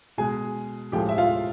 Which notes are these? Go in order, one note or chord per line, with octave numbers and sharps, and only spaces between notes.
B2 G#3 G#4 G#5
A2 F3 G#3 G4 G5
E5
F4 F5